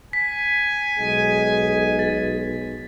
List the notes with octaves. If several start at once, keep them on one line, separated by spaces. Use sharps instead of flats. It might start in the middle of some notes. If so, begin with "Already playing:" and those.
G#5 B6
B1 G#3
A6